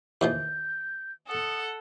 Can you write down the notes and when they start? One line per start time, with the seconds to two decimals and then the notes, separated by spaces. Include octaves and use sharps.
0.21 D#2 E3 F3 G6
1.28 A4 F#5 D#6